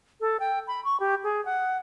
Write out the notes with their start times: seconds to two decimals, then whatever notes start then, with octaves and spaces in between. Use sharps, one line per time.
0.21 A4
0.40 G5
0.68 B5
0.85 C#6
1.00 G4
1.24 G#4
1.45 F#5